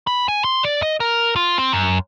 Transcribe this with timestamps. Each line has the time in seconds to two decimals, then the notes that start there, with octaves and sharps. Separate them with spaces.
0.07 B5
0.28 G#5
0.44 C6
0.63 D5
0.83 D#5
1.00 A#4
1.36 F4
1.58 C4
1.73 F#2